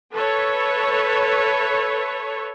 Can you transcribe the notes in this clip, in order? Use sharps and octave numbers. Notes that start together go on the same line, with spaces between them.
A4 B4 C#5 E5